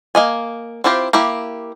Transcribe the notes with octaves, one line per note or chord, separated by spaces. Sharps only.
A#3 D#5 G#5
C4 E4 F4 G4 C5
A#3 E4 G4 A#5